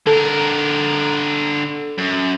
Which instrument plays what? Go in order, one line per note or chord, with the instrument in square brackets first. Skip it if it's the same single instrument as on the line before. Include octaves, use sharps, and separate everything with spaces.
[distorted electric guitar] D3 A#4 [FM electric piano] A4
[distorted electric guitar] F#2